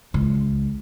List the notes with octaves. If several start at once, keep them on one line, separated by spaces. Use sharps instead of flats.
C#2